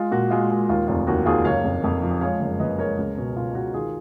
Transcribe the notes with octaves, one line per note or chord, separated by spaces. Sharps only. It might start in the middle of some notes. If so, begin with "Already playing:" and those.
Already playing: G#3 F4
A#2 F#4
G#3 F4
G#3
D#2 F4
F1 F4
D#2 F#4
D#2 F4 G#4
F#1 C#5 F5
F2
F2
F3
G#3 C#5 F5
F#1
F#1 B4 D#5
G#3 A#4 C#5
C#2
B2
B2 F4
B2 F#4
D#3 F4 G#4